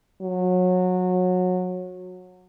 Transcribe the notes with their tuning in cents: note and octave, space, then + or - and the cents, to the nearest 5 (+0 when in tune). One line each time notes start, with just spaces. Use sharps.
F#3 -25